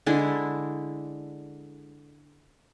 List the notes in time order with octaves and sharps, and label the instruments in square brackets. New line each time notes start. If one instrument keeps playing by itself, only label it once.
[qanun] D3 G#3 D4 E4